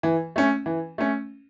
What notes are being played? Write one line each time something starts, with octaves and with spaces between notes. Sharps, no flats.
E3
A3 C#4
E3
A3 C#4